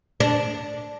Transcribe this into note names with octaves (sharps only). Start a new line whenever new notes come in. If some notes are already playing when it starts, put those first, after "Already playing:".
D4